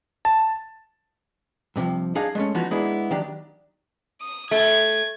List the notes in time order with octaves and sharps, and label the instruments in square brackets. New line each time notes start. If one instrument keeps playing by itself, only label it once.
[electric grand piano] A5
[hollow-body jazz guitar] G2 C3 D#3 F3
D4 D#4 G#4 D#5 F5
G#3 A3 C#4
E3 F3 B3 D#4 F4 F#4
G#3 A#3 B3 D4 E4 G#4
D#3 F#3 D4 G4
[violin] D#6
[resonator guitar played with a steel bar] A3 [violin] G#6